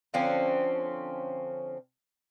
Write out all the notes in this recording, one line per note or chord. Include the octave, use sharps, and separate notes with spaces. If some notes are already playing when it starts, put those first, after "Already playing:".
D3 F3 C4 C#4